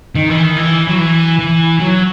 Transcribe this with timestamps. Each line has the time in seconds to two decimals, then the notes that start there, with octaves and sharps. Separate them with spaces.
0.15 D#3
0.29 E3
0.43 D#3
0.56 E3
0.88 F#3
0.98 E3
1.39 E3
1.80 F#3